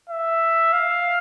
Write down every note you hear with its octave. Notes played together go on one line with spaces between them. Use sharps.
E5
F5